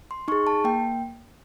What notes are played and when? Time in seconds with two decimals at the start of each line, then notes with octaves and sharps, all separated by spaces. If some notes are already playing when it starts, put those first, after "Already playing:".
0.11 C6
0.28 D#4 G#4 C#6
0.47 A5
0.64 A#3 G5